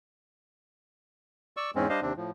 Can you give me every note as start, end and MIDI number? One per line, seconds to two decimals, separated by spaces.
1.57 1.71 74
1.57 1.71 85
1.57 1.71 88
1.75 1.88 40
1.75 1.88 44
1.75 1.88 56
1.75 1.88 60
1.75 1.88 61
1.89 2.00 55
1.89 2.00 62
1.89 2.00 72
1.89 2.00 75
1.89 2.00 77
2.02 2.13 39
2.02 2.13 48
2.02 2.13 60
2.02 2.13 62
2.17 2.31 45
2.17 2.31 53